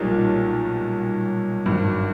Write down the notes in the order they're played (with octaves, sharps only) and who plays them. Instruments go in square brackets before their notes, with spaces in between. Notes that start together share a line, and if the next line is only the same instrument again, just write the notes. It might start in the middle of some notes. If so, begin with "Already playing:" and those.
Already playing: [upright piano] B1 A#2 F#3 A#3 D#4 [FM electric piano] G3
[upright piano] G#1 G2 D#3 [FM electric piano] F#3